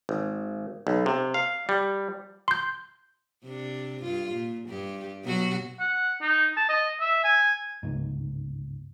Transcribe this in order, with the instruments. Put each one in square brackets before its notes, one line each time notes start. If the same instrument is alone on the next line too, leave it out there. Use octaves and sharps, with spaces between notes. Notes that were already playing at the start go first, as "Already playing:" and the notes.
[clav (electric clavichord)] G#1
B1
C3
F5
G3
[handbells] C6 G6
[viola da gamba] C3 D4
G2 F4
A#2
G2 G4
B2 F#3 F#4
[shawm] F#5
D#4
A5
D#5
E5
G#5
[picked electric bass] G1 C#2 G#2